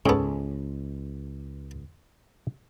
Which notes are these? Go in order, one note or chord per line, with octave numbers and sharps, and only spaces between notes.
C#2 G#2 B3 C#4 G#4 A4